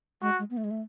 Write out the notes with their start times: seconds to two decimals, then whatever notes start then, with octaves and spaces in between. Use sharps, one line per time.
0.22 G#3 F#4
0.39 G#3
0.50 B3
0.57 A3
0.64 G#3
0.71 A3